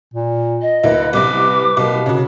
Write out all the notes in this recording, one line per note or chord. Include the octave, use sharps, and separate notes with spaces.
A#2
D#5
D2 A#3 E4 B4
C2 C3 D6
C2 B2 A#3
C#3 F#4